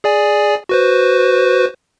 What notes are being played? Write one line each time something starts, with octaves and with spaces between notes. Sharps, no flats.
G#4 D5 G#5
F#4 B4 C5